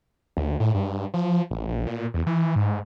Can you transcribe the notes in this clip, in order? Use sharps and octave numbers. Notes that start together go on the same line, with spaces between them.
D2
A2
G2
F3
A1
A#1
A#2
E2
E3
G#2